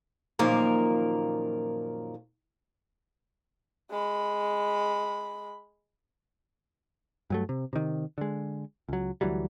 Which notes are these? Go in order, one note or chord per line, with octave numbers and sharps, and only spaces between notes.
F#2 A#2 D#3 F3 A#3 A#4
G#3 B5
G2 F#3 A3
C3
C3 D#3
D3 G#3
C#2 F#3
D2 E3 F#3 G3